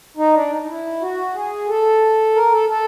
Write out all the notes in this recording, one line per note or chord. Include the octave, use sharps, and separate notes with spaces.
D#4
D4
D#4
D#4
E4
F#4
G#4
A4
A#4
A4
A4